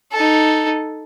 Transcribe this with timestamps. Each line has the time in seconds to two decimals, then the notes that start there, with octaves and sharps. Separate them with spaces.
0.13 D#4 A4